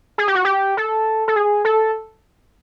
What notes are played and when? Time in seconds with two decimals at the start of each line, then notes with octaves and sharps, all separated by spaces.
0.18 G#4
0.28 G4
0.35 F#4
0.45 G4
0.77 A4
1.28 A4
1.36 G#4
1.65 A4